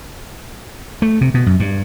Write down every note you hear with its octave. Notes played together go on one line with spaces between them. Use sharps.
A3
C3
B2
F#2
G2